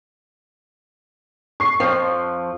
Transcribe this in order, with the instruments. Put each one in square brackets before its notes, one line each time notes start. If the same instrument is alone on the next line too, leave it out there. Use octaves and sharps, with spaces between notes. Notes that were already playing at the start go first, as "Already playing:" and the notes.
[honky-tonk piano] C#6 C7
[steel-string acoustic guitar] F2 F3